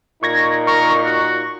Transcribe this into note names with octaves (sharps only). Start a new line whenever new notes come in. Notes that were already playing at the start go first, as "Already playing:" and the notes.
A#2 D#4 C#6 G#6 A#6
A#4 C#6
F#4